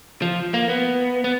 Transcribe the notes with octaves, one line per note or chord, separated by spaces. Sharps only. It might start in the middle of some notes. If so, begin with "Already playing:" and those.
F3
A#3
B3
B3